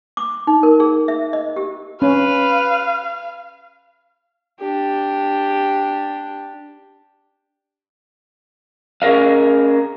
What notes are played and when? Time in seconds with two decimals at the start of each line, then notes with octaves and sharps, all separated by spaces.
0.17 D6
0.47 D#4
0.63 A#4
0.80 G#4
1.08 E5
1.33 D#5
1.56 G4
2.02 C#4 B4 F5
4.60 D4 G4
9.02 C#4 G#4 A#4 D#5 F5